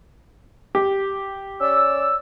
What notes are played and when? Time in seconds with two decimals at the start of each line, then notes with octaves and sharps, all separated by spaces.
0.75 G4
1.61 C#4 D5 E6